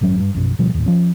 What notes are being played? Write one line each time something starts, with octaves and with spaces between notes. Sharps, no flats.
G#1 F#2 F#3 C#4
G2
A#1 F#2 B2
D1 B2 F3 G3
D#2 A2
F3 C#4